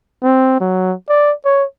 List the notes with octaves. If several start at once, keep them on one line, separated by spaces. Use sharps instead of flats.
C4
F#3
D5
C#5